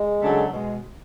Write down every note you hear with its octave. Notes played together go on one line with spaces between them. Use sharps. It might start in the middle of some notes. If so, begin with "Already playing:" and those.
Already playing: G#3
C#3 F#3 A3 D4 A4
B2 G#3